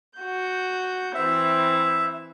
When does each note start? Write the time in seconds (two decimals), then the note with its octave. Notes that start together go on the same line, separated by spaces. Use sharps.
0.18 F#4 G6
1.15 E3 C4 E5